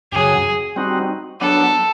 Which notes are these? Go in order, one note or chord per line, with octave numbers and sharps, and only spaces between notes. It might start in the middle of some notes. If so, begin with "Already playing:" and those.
F#2 C#3 F#3 G#4
G3 C4 D#4 F#4
F#3 B3 D4 A4